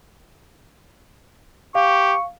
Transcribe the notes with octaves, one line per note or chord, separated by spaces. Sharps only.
G4 F5 C#6